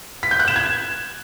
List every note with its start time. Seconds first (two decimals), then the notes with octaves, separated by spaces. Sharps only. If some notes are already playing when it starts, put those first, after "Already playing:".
0.23 B6
0.31 G6
0.39 F#6
0.48 E7
0.56 G#6